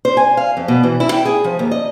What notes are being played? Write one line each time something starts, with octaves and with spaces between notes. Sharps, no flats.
C5
G#5
F5
F2
B2
E3
E4
G5
G#4
F3
D#2
D#5